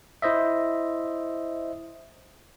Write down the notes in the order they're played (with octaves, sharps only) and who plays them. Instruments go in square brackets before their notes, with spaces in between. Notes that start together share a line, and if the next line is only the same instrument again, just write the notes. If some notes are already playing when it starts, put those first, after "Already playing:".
[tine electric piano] E4 C5 D#5 E5